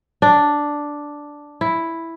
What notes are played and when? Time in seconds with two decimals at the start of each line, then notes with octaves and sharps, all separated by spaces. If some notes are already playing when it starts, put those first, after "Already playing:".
0.22 D4
1.61 E4